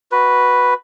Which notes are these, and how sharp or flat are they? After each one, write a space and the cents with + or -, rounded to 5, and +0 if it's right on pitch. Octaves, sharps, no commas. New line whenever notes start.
F#4 +0 B4 +0